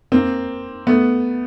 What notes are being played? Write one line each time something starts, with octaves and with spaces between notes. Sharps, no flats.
A#3 C4
A3 B3